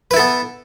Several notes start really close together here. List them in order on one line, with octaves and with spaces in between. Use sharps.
B4 E4 A4 B3